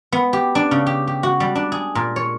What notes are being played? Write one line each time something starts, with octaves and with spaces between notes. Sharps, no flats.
B3
G4
D4
C#3
G4
G4
F#4
G3
D4
G#4
A#2
C#5